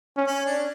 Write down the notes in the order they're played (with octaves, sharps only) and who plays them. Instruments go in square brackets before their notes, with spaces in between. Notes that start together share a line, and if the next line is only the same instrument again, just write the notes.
[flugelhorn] C#4
[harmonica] C#4
D4